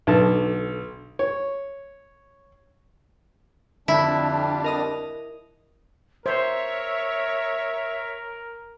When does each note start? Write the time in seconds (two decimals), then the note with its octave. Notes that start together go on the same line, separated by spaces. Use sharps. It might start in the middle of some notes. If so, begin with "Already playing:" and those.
0.07 B1 D3 A5
1.19 C#5
3.88 F2 D3 G3 D4 E4 B6
4.64 A#4 D#5 D#6
6.26 A#4 C5 C#5 E5